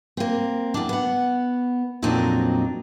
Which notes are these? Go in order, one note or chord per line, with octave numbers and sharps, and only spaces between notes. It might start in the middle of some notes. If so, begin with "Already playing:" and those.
A#3 C4
E2 D4
B3 F#5
F2 A#2 F#3 C4 D4 D#4